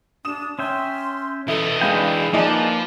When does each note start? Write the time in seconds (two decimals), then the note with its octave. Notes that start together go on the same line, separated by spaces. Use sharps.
0.25 D4 D#6 E7
0.59 C#4 E5 G5 C6
1.48 E3 E4 A4 D#5
1.81 B1 G#3 D4 G#4 B4 G5 A#6
2.33 F3 A#3 D#4 B4 D5 G#5